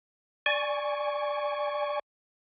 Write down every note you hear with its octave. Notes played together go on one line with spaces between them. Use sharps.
D5 G#5 C#6